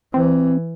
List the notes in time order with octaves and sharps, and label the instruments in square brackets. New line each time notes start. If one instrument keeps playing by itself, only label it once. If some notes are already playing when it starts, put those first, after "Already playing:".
[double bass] E3 [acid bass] C4